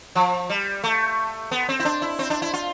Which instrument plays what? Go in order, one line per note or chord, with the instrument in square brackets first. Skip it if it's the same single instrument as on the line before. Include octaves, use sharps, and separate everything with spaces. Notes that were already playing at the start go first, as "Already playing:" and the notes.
[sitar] F3
G3
A3
B3
C4
E4
D4
E4
C4
D4
E4
F4